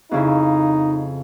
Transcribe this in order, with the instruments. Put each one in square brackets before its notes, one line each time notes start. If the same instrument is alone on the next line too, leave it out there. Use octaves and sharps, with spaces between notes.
[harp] F2 C#3 E4 [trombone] D#4